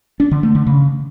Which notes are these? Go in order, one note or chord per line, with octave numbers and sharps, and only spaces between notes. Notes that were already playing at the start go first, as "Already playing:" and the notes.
D4
D3
A3
D3
C#3